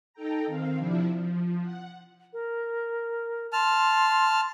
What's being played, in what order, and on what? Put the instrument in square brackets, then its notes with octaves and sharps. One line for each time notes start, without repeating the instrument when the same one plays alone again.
[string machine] D#4 A4 G5 A#5
D#3 C4 F5
C3 F3 D4 E4
F3
F#5
[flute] A#4
[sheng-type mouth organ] A5 F6 [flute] C6